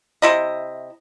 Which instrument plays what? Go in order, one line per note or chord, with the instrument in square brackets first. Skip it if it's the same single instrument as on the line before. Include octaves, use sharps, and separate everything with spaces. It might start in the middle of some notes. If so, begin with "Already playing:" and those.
[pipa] C3 E4 D#5